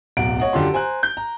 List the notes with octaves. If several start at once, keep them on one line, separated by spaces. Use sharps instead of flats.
D1 B1 F#5 D7
C#5 D#5 F#5
F#2 D3 F4 G4 C6
C5 G#5 A#5 F#6
G6
A#5